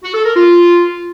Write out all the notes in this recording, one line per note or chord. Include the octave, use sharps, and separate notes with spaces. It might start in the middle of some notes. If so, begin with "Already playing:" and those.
F#4
A4
A#4
F4